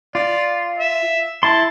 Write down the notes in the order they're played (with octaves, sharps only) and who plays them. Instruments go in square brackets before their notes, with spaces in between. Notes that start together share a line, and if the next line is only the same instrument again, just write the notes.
[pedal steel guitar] F4 [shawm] D5
[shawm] E5
[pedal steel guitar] E4 C6 [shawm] A5